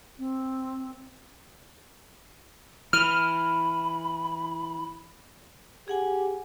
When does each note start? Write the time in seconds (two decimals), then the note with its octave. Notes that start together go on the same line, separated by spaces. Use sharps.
0.19 C4
2.93 E3 B5 F6
5.88 G4 G#4 F#5 G#5